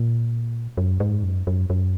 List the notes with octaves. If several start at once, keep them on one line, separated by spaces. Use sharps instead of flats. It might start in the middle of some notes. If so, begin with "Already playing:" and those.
Already playing: A#2
F#2
G#2
F#2
F#2
F#2